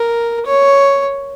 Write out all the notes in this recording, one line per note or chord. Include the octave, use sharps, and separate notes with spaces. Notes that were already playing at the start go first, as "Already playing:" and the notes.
Already playing: A#4
C#5